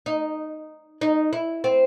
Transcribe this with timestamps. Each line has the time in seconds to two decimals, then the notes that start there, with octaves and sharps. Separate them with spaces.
0.06 D#4
1.01 D#4
1.33 E4
1.64 C4